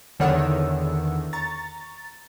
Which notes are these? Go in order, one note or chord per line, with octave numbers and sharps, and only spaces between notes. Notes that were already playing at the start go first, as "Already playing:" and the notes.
E2 D3 D#3 C#5 F#5 E6
A#5 C#6 A6